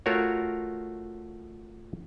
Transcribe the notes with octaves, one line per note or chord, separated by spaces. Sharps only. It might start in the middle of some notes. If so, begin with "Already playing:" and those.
A3 F4 F#4 A#4 C#5